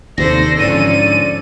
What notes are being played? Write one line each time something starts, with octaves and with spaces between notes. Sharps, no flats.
D#2 C3 D#3 A4 C5 D5 A#6
G#2 D3 F3 C#4 A4 D5 D#7